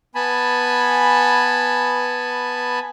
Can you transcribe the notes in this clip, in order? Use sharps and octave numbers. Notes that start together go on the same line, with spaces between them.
B3 G#5 A5 B5